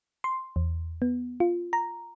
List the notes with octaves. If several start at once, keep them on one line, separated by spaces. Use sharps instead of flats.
C6
E2
B3
F4
A#5